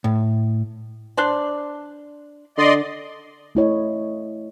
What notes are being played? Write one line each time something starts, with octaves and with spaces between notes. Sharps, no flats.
A2
D4 C5 D5
D3 D5 D#5 C6
A3 E4 C#5 D#5